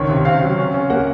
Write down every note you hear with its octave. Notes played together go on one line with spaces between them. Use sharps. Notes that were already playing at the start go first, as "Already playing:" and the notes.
Already playing: C#2 D#3 C#5
C3
C4 F5
F#3
C#4
C#4
A#3 F#5